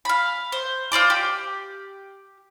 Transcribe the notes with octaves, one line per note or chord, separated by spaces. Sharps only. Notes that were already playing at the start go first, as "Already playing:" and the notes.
F5 B5
C5
F4 C5 D5 D6
G4